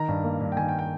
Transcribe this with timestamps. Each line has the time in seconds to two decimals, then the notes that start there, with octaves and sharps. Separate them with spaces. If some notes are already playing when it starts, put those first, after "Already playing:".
Already playing: D#3 A#5
0.08 G2
0.24 A#3
0.41 G2
0.52 G5
0.57 D#3 G#5
0.69 G5
0.79 G5